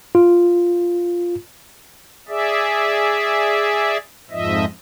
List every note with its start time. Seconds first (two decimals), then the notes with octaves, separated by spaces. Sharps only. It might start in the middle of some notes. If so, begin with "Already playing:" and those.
0.15 F4
2.28 G#4 D5 E5
4.31 F2 G#2 F3 D#5 E5